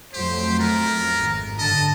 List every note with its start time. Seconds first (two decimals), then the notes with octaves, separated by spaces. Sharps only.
0.13 F2 F#3 A3 G4 C5
0.59 B3 A#4
1.20 G#1
1.59 G2 D3 D#5 A5